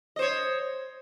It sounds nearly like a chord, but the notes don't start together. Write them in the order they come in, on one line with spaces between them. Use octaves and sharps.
D#5 C5 C#5